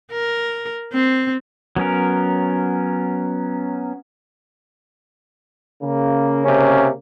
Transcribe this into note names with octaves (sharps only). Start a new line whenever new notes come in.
A#4
C4
F#3 B3 C#4 A#4
C#3 A#3
C3 C#4